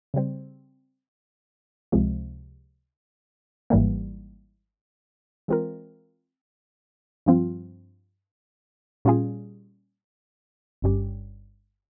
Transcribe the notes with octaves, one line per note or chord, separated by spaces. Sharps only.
C#3 G3 C4
C#2 C3 F3 G#3
G#1 G#2 E3 G3 A#3
E3 G#3 C4 F4 A#4
G2 F3 C4 F4
A#2 G3 C#4 F4 G#4
G1 G2 G3 C#4 G4